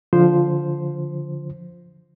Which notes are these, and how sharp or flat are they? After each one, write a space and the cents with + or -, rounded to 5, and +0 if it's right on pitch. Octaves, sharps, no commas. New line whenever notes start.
D3 -25 F3 +0 C5 +0